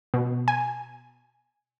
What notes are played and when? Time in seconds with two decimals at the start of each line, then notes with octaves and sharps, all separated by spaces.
0.14 B2
0.48 G#5